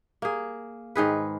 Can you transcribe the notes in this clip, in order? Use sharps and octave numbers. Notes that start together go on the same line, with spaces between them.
A#3 G#4
G#2 D#3 G#4 B4